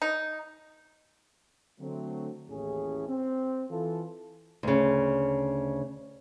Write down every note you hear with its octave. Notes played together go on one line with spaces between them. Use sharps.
D#4
D3 F#3 A3 C4
A1 D#2 A2 C#4 G#4
C4
E3 F4 A4
D2 C#3